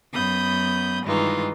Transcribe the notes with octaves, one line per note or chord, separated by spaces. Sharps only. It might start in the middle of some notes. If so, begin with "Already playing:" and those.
F#2 B3 B5 D#6 G6
G2 D#3 E3 G#3 D#4 F4